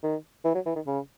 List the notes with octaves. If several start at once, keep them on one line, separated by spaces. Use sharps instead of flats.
D#3
E3
F#3
E3
D#3
C#3